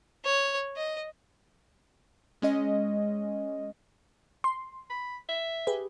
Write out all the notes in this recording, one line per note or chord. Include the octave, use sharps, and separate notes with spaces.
C#5
D#5
G#3 C#4 D#5
C6
B5
E5
G4 G#4 B4